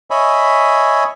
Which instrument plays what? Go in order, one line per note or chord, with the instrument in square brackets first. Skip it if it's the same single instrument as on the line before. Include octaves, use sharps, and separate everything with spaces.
[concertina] C#5 D#5 E5 G#5 B5